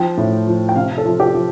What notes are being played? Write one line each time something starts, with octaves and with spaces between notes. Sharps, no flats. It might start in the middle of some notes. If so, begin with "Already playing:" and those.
Already playing: F3 G5
A2
F3
G5
C3 F5
A4
F3
G4
F3